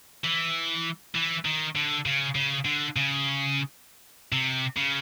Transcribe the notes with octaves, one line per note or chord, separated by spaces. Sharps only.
E3
E3
D#3
D3
C#3
C#3
D3
C#3
C3
C#3